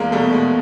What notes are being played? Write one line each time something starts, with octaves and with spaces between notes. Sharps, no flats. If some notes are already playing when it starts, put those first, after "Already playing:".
Already playing: E2 G#3 A#3
B2 G3 A3
B2 G#3